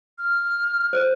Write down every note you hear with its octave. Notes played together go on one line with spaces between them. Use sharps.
F6
C5